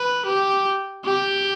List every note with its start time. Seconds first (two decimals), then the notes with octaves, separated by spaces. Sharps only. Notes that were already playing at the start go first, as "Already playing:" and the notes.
Already playing: B4
0.26 G4
1.05 G4